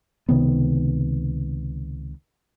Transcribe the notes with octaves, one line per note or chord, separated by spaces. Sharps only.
C#2 C3 D#3 B3